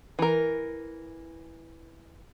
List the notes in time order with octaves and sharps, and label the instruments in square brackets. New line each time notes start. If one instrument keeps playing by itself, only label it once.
[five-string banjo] E3 A#4